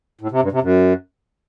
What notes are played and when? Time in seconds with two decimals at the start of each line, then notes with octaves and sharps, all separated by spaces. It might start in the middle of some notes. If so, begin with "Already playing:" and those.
0.21 A2
0.31 C3
0.41 G2
0.52 C3
0.62 F#2